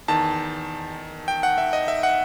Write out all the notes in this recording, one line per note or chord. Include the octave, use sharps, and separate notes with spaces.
E2 D#3 A5
G5
F#5
E5
D#5
E5
F#5